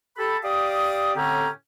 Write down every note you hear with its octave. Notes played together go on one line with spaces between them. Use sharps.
G4 A4 B5
G4 D5 F5 D#6
A2 D3 C4 C#4 G4 A#5